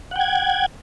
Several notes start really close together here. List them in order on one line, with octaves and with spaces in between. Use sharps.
F#5 G5 G#6